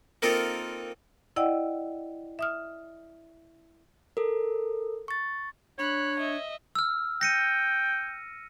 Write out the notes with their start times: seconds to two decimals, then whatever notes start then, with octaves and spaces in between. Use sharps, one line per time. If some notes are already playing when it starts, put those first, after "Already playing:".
0.22 A#3 C4 D#4 F4 A4 A#4
1.36 E4 D5 D#5 F#5 G5 E6
2.39 E5 D#6 F6
4.17 A4 A#4
5.08 C#6 A6
5.79 D4 C#5 B5 F#6
6.20 D#5 E5
6.75 E6 F6
7.21 G5 A#6 C#7 D#7